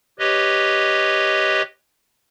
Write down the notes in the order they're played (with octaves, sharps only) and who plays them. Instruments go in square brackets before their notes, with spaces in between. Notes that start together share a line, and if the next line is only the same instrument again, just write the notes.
[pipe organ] G4 B4 C#5 D#5